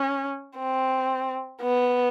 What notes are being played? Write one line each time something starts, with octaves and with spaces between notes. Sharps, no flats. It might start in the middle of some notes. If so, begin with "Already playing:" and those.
Already playing: C#4
C4
B3